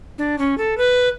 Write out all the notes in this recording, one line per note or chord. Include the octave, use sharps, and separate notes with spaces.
D4
C#4
A4
B4